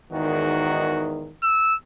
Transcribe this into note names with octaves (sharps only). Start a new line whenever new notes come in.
E2 G#2 D#3 F#4
E6